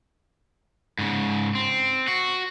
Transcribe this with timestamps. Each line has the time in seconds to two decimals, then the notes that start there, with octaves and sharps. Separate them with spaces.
0.99 G#2 C#3
1.55 C4
2.08 F#4